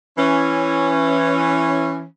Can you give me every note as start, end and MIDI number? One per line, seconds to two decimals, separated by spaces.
0.18 2.04 52
0.18 2.04 61